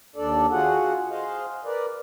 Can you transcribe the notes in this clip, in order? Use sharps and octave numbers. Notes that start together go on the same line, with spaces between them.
D#2 D4 A4 D5
F4 F#4 G#4 F#5
G#4 C5 D#5 F5
A#4 B4 D5